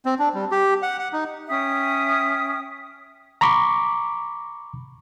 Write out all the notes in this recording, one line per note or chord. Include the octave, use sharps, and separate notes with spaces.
C4
D4
G3
G4
F#5
F#5
D#4
C#4 E5 G5 D#6
A#5 B5 C#6 D6